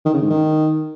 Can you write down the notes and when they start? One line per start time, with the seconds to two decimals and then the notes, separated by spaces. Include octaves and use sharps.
0.06 D#3
0.14 C#3
0.22 G#2
0.30 D#3